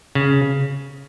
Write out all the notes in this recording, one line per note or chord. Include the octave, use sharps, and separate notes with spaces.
C#3